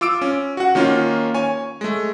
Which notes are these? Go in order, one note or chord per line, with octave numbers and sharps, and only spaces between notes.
F4 D6 E6 D7
C#4
F#4 F#5
D#3 A#3 C#4 F4
C#5 G#5
G#3 A3